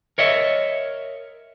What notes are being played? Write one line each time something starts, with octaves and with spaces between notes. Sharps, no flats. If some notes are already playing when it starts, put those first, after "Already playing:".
A#4 C#5 D#5 E5